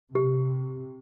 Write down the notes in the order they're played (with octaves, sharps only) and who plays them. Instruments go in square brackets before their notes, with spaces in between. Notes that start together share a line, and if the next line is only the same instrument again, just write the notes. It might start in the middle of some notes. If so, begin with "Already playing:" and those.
[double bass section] C3 [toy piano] G4